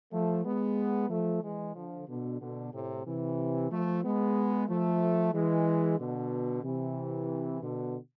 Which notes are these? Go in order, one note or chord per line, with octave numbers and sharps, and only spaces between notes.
F3 A3
G#3 B3
F3 A3
E3 G#3
D3 F3
B2 D3
B2 D3
A2 C3
C3 E3
F3 A3
G#3 B3
F3 A3
E3 G#3
B2 D3
C3 E3
B2 D3